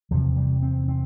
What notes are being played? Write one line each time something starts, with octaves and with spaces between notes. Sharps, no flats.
E2 C3 F3
G3
C4
C4